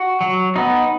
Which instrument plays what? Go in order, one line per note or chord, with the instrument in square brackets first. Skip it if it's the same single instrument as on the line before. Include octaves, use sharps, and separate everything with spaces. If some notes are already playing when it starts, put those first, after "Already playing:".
Already playing: [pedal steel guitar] F#4
F#3
B3 D#4